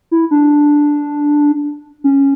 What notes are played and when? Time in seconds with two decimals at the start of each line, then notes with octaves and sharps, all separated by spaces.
0.11 E4
0.31 D4
2.04 C#4